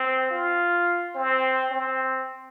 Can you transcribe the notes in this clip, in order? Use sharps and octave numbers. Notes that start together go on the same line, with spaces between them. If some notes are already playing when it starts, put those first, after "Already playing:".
Already playing: C4
F4
C4
C4